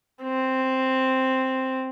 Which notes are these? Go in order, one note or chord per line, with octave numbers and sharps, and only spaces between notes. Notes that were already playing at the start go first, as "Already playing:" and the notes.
C4